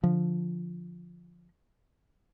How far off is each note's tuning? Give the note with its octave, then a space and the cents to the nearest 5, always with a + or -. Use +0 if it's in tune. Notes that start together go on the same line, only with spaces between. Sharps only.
D3 +0 F3 +0